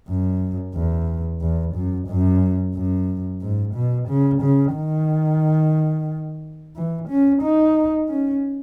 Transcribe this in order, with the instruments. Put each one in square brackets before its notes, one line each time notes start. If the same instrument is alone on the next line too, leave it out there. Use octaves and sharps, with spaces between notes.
[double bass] F#2
E2
E2
F#2
F#2
F#2
G#2
B2
C#3
C#3
D#3
E3
C#4
D#4
C#4